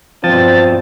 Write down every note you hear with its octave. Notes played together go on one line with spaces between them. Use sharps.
G2 B2 F3 C4 A5